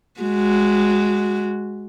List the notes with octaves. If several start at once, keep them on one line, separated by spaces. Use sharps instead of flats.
G#3 F#4